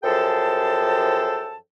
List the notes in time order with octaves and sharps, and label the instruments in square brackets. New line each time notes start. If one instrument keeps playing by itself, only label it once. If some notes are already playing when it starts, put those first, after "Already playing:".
[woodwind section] F#2 F3 G#4 A4 G5 A5